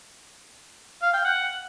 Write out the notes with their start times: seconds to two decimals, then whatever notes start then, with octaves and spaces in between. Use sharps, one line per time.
1.02 F5
1.13 G5
1.24 F#5